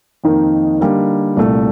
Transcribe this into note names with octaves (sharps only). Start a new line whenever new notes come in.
F2 D#3 A#3 D#4
D3 G3 A#3 D#4
C2 A#2 A3